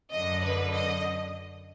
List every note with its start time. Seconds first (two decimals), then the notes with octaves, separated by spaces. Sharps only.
0.11 F#2 D3 D#5
0.43 B4
0.73 D#5